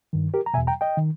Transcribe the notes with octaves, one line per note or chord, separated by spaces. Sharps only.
G2 D#3
G4 A#4
A#5
E2 B2 E5 G#5
G5 A#5
D#5 G5
D#3